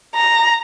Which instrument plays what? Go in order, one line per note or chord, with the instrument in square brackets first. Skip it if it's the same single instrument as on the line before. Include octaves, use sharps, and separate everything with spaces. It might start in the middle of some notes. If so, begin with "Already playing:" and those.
[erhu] A#5